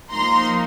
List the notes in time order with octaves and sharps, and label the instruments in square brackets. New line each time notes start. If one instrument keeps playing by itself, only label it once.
[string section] F3 A#3 D#4 A#5 C6